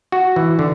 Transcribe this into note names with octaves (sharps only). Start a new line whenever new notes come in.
F#4
E3
D3